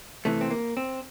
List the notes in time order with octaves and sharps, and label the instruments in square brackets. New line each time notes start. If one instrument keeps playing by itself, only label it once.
[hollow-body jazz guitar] C3 E3 A3
C4
A#3
C4